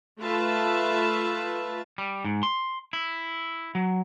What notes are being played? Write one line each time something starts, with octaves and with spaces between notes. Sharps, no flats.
A3 F4 B4 E5 A5
G3
G#2
C6
E4
F#3